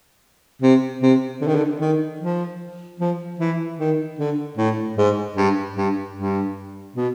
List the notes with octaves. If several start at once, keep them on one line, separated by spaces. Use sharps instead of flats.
C3
C3
D3
D#3
D3
D#3
F3
F3
E3
D#3
D3
A2
G#2
G2
G2
G2
B2